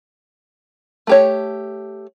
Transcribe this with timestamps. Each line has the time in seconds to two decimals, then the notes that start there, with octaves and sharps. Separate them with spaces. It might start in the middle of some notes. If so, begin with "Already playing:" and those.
1.07 A3 G4 C#5